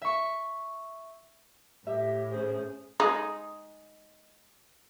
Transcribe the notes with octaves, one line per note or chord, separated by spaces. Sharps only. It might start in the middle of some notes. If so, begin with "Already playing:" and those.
E5 C#6
A2 G4 E5
C#4 G#4 C5
G#3 D#4